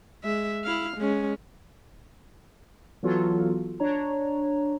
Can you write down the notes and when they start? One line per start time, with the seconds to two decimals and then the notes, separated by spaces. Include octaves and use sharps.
0.24 G#3 E5
0.64 E4 F5
0.97 G#3 C#4
3.03 E3 F#3 B3 F4 F#4 A4
3.80 D4 C#5 A#5